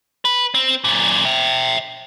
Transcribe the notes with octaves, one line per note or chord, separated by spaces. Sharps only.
B4
C4
F#2 A#2
E5 G5